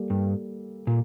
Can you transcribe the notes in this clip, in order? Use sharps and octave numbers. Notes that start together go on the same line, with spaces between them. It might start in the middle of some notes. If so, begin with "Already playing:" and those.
Already playing: G3 A#3 A4
G2
A#2